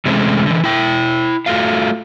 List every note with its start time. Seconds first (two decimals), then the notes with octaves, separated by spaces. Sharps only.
0.06 C3 E3 G#3 A3 C4 C#4
0.46 D3 E3
0.64 E4 G5
1.46 A3 F4 F#4 F5